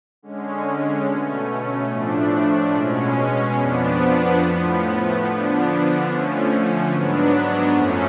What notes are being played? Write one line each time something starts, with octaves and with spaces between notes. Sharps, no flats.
D3 G#3 C#4
B2 A3 C#4
A2 F3 A3 D4
B2 G#3 C#4
F2 F3 B3 D4
A2 F3 B3
D3 F3 B3 D4
D3 F3 A3 C#4
G#2 F#3 B3 D4
F#2 F3 A3 C#4